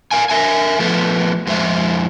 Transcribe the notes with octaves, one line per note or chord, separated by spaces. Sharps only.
A#4 F5 G#5
A#4 E5 G#5
F3 A3 B3
F2 G#3 C5 E5